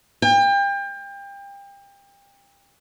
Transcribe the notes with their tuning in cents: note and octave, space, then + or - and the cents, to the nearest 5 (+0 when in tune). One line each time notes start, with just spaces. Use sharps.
G5 +30